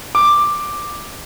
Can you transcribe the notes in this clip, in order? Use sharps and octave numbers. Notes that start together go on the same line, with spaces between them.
D6